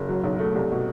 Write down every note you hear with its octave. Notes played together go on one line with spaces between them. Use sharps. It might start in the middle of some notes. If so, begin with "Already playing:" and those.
Already playing: F#1
F#3
B1
A3
C2
B2